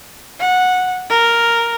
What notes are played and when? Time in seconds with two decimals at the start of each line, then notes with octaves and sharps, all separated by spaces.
0.40 F#5
1.10 A#4